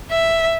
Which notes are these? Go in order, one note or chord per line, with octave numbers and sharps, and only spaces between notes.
E5